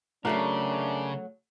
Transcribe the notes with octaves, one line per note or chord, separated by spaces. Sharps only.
C#3 F#3 A3 D4 F#4 A#4